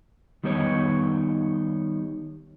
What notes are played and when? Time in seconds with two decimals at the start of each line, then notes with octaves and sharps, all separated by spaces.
0.44 D#3 G3 B3 D#4 G#4 C#5